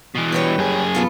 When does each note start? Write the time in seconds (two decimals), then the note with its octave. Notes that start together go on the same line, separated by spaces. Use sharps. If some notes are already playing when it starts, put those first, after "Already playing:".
0.15 B2 E3
0.32 G3 B4 C#5
0.58 F#2 G#4
0.95 B3 F4 A4